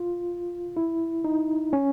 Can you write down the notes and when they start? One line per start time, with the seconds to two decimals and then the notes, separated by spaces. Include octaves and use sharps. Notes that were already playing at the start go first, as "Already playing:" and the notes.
Already playing: F4
0.77 E4
1.24 D#4
1.73 C#4